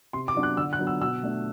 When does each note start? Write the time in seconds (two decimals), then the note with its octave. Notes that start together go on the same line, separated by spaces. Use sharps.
0.13 C3 C6
0.28 D6
0.36 F#3 B3 D4
0.43 F#6
0.57 D3 E6
0.73 F#6
0.79 F#3 B3 D4
0.87 E6
1.01 B2 E6
1.23 A3 D4